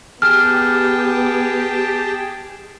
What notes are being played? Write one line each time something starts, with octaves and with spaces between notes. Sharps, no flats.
B3 G4 G#4 G5 A5 F6